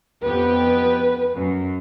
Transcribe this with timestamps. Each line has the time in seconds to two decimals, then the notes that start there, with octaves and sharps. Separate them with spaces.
0.23 F2 B3 G4 B4
1.35 F#2